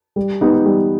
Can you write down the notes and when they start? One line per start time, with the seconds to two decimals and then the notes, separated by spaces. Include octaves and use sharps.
0.16 G3
0.41 B3 D#4 G4
0.66 G3